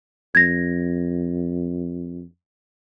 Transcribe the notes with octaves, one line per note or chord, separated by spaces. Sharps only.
F2 G#6 A#6